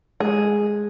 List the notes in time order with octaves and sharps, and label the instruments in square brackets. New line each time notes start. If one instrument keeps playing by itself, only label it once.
[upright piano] G#3 [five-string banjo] G#4